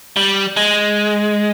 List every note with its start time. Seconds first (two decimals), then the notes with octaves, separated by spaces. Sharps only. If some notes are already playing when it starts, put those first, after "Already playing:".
0.16 G3
0.57 G#3